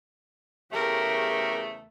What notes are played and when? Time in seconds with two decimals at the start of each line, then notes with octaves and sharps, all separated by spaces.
0.72 E2 C#3 A3 G4 A#4